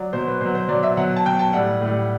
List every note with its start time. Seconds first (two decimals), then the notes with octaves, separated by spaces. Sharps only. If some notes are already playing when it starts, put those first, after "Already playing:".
Already playing: F#3 D5
0.13 B2 F#3 C5
0.27 B4
0.41 B2 F#3 C5
0.55 C5
0.69 B2 F#3 D5
0.83 E5
0.97 B2 F#3 F#5
1.16 A5
1.26 B2 F#3 G5
1.39 A5
1.53 A2 G3 F#5
1.81 A2
1.86 G3